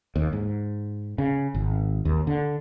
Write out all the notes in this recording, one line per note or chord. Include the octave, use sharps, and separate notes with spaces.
D#2
G#2
C#3
G#1
D#2
D3